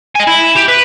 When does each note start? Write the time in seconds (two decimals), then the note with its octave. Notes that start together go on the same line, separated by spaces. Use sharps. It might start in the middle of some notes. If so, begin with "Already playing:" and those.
0.15 D#5 G#5
0.27 E4
0.56 G4
0.68 B4